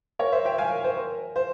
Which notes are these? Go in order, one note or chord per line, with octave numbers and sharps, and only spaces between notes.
A#4 C#5
C5 E5
E5 G5
F5 G#5
A#4
C5
A#4
C5